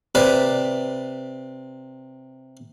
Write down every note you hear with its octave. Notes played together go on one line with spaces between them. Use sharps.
C3 B4 D5